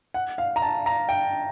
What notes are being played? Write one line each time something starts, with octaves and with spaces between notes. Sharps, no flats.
F#5
F5
A#5
A5
A#5
G5